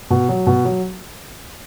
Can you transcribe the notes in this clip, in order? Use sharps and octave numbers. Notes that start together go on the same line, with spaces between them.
B2
F#3
B2
F#3